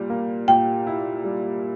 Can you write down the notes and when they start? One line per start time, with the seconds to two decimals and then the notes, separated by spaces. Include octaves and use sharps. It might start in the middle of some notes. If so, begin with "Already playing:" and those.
Already playing: A#2 G3
0.10 A#3
0.48 A#2 G5
0.87 E4
1.24 G3